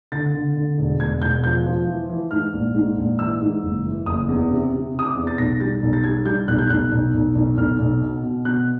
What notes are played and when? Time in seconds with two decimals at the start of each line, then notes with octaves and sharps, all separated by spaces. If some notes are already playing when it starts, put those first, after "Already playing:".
0.12 D3 A6
0.34 D3
0.56 D3
0.78 E1
1.00 E1 G#6
1.22 E1 G6
1.44 F3 G6
1.66 F3
1.87 E3
2.09 E3
2.31 G#2 F6
2.54 A#1
2.75 G#2
2.97 A#1
3.19 E3 E6
3.41 G#2
3.63 F#1
3.85 E3
4.06 F#1 D#6
4.29 E2
4.51 C3
4.73 C3
4.95 C3 D#6
5.05 D6
5.16 E2
5.27 A6
5.38 B1 A#6
5.60 G3 A6
5.83 B1
5.93 A6
6.04 G3 G#6
6.26 G3 G6
6.48 B1 F#6
6.58 G6
6.70 B1 F#6
6.92 B1
7.14 B1
7.35 B1
7.57 B1 F6
7.79 B1
8.01 B2
8.24 B2
8.45 B2 F#6